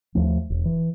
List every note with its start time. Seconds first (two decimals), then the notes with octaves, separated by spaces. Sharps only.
0.15 D#2 F3 A3
0.50 E1
0.65 E3